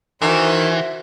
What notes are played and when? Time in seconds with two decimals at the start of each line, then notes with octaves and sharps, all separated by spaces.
0.22 D#3 E3 F#4 C5 E5